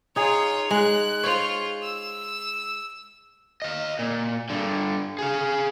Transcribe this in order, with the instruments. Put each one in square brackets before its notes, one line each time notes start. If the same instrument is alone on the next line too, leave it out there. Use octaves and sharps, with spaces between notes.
[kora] D#4 G#4 [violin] F4 C#5
[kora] G#3 [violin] F#6
[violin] F4 [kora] C5 C#5
[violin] E6
[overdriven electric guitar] D#5 F5
A#2
G2 D3
G#4 F5